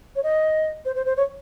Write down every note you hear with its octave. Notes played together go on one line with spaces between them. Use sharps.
C#5
D#5
C5
C5
C5
C#5